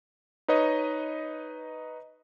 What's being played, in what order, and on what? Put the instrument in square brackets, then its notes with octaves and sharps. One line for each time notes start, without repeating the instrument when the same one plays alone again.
[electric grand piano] D#4 B4 C#5 D#5